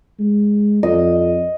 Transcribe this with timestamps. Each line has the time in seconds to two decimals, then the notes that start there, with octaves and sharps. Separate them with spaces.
0.20 G#3
0.83 F2 D#5